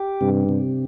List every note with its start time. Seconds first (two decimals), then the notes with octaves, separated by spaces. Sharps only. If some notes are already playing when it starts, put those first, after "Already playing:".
Already playing: G4
0.21 G2 C3
0.49 C3